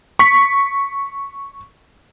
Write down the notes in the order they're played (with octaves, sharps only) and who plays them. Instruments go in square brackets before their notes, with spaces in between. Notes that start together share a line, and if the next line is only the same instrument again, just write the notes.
[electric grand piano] C#6 B6